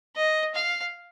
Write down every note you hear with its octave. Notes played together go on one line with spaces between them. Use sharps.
D#5
F5